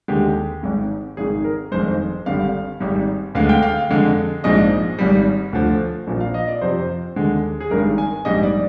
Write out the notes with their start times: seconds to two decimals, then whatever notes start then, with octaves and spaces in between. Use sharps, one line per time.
0.08 D#2 D3 G#3 G4
0.63 G#1 G#2 D#3
1.17 G#1 G#2 D#3 G#4
1.44 A#4
1.72 G1 F2 D#3 G#3 C5
2.26 G#1 G2 D3 G3 F5
2.80 G#1 G#2 G3
3.35 D2 D3 G#3 F5
3.49 G5
3.63 F5
3.90 F2 D3 G#3
4.44 A#1 G#2 F3 G#3 D#5
4.99 G#1 G#2 G3
5.53 D2 D3 F3
6.07 A#1 A#2 F3
6.20 F5
6.34 D#5
6.48 D5
6.62 F2 C3 F3 C5
7.16 D#2 D3 G#3
7.61 G#4
7.70 G#1 G2 D#3 G#3 A#4
7.98 G#5
8.25 A#1 G#2 G3 D#5
8.43 D5